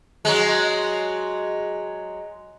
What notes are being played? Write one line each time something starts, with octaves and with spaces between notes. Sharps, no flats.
F#3 G#3